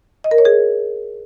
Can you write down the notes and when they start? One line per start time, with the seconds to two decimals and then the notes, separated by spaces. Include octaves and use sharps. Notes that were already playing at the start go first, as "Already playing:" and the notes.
0.24 D#5
0.31 A#4
0.38 C#5
0.45 G#4